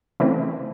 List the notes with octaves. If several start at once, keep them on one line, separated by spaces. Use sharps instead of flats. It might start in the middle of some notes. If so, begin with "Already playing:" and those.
C#3 E3 A3 C4